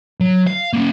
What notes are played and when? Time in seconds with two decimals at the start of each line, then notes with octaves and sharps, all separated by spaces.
0.21 F#3
0.47 F5
0.73 A#3 C#4